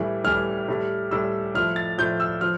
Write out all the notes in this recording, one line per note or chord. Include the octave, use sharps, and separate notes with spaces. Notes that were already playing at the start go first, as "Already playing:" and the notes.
Already playing: A2 E3 G3
A2 E3 G3 F6
A2 G3
A2 G3 E6
A2 F3 F6
A6
A2 F3 G6
E6
F3 F6